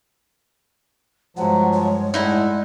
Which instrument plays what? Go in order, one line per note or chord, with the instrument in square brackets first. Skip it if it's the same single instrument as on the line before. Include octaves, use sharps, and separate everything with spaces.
[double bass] G2 G#3 [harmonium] F3 F#3 [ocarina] F#5
[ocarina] C#5
[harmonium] A2 [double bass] G#3 [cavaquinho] D#4 E4 F#5 [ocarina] D5